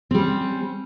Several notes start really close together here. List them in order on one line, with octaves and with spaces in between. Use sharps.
C4 G3 C#4